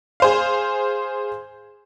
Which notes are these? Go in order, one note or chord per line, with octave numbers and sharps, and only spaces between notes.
G#4 C5 F5